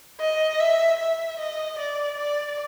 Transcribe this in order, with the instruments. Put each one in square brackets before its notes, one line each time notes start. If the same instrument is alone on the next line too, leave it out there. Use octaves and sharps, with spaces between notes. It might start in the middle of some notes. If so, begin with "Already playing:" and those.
[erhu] D#5
E5
E5
D#5
D5
D5